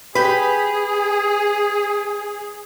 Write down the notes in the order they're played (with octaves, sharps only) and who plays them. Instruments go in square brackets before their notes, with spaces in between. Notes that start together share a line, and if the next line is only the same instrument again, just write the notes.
[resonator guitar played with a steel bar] G4 B4 [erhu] G#4